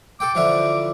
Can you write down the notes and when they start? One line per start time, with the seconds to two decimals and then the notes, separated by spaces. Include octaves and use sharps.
0.20 A4 G5 D6
0.35 D3 E3 F3